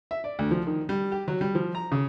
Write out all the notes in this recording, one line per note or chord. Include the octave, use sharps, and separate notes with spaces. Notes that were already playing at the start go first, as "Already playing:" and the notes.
E5
D5
D2
F3
D#3
G3
G4
F#3
G3
F3
A#5
C#3